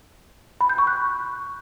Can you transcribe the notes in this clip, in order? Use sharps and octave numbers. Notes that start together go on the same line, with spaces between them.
B5
G6
C#6
F#6